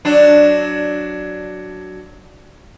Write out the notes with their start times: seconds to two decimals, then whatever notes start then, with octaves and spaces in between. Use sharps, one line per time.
0.05 F#3 D4